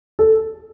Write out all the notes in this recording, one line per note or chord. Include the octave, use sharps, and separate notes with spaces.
A4